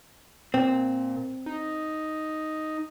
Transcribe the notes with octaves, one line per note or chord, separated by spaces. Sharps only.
A#2 C4
D#4